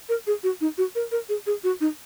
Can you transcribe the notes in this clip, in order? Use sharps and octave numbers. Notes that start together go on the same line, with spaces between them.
A#4
G#4
F#4
D#4
F#4
A#4
A#4
G#4
G#4
F#4
D#4